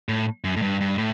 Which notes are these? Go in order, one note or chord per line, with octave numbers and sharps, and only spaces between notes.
A2
F#2
A2
G2
G2
A2